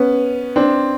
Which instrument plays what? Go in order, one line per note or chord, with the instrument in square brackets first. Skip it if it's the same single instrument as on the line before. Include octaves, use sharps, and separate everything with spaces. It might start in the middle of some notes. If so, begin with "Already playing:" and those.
Already playing: [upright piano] B3 C#4
C4 D4